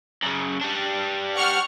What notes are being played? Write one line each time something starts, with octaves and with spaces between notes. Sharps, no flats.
F#2 C#3
G3 D4
F#5 C#6 F6